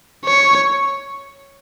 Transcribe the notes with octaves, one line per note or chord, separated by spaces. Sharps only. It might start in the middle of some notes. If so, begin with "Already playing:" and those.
C#5